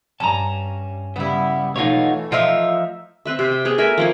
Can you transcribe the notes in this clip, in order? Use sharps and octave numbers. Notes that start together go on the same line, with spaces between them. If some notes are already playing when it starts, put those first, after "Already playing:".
G2 C#4 A5 A#5
C#3 G3 B3 E4
B2 E3 F#3 A3 D#4 F4 C#5
F3 D#4 F4 E5
C4 B4 E5
C3
G5
B3 G#4
A3 A#4 E5 G#5
F3 A#3 E4